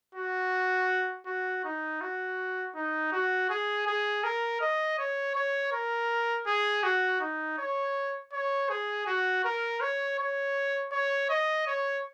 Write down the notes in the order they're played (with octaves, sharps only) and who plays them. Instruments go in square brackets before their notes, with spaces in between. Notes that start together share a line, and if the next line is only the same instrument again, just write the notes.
[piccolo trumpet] F#4
F#4
D#4
F#4
D#4
F#4
G#4
G#4
A#4
D#5
C#5
C#5
A#4
G#4
F#4
D#4
C#5
C#5
G#4
F#4
A#4
C#5
C#5
C#5
D#5
C#5